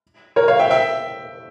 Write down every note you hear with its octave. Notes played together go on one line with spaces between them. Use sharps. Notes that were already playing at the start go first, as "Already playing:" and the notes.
A#4 C#5
C#5 F5
E5 G5
E5 G5